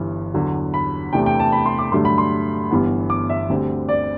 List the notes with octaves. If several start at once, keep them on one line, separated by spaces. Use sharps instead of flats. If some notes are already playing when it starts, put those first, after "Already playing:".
Already playing: G1 G2 E3
E2 D3 F#3
B5
E2 C3 E3 A3 D4 G5
G5
A5
B5
C6
D6
G2 D3 F#3 A3 D4 C6
B5
C6
G1 G2 E3 B3
D6
E5
D2 D3 G3 C4
D5